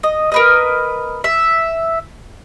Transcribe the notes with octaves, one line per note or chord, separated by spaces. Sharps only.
D#5
A#4 B4 D#5
E5